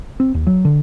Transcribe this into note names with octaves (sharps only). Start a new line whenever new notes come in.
C4
D#2
F#3
D3